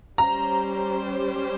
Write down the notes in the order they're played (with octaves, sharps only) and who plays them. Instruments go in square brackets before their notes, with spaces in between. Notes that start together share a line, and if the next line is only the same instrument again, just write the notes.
[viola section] G3 C#4 G4 C5 [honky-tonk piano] A#5